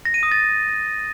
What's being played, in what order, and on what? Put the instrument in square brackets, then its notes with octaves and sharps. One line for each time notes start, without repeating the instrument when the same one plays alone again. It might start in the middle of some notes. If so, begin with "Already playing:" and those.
[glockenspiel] A#6
D#7
D#6
A6